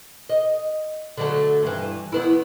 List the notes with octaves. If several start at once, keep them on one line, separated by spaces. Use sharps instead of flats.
D#5
D3 F#3 A3
G2 E3
E2 B3 E4